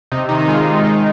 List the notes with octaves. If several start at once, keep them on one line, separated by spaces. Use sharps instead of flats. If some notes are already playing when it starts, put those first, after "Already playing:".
C3 D#4
D#3 D#4
D#4
G#3 F4
G#3
D#3 D#4